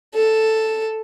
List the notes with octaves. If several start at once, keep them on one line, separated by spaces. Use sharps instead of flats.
A4